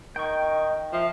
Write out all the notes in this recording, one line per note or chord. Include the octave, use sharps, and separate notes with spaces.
D#3 D#5 G5 C#6
F3 E5